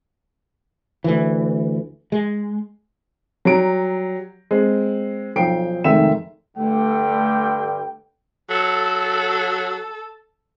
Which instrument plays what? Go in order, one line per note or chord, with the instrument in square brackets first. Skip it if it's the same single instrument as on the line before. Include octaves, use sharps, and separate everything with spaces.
[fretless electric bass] D2 E3
G#3
[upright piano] F#3 G3 A#5 D7
G#3 C4
B1 F3 G5 C7 D7
F1 G#2 D#3 E5 E7
[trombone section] G2 D3 [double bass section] A3 [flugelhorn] G5
[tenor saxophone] F#3 [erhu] A4